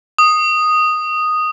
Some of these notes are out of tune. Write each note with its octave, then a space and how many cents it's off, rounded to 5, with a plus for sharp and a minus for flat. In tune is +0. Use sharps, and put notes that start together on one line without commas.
D#6 -5